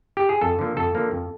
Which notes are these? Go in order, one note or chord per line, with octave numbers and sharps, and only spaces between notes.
G4
G#4
F2 A4
D3 F3 A#3
F2 A4
D3 F3 A#3
F2